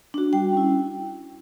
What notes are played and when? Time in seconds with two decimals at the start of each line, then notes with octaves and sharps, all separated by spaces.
0.14 D4 F#4
0.33 G3 G5
0.53 C#4 E4